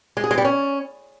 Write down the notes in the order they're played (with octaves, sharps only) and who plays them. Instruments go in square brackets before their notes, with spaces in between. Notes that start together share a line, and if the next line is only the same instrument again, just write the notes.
[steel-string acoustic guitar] G#3
G#4
G#3
G3
C#4